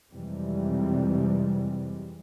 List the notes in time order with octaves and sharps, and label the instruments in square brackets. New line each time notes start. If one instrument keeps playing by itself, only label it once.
[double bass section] F2 C3 E3 G3 G#3